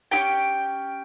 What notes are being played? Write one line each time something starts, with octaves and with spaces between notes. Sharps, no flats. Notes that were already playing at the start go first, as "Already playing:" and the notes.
C#4 E4 G4 G5